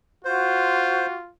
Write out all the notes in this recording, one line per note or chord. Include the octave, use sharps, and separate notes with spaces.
F4 F#4 C5